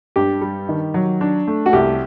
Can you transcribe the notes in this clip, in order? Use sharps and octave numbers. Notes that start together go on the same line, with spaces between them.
G2 G4
G3
D#3
F#3
D4
A3
F#4
C2 G4